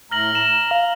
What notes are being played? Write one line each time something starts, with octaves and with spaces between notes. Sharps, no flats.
A2 A3 A#5 F6 A#6 F#7
A#5 E7
F5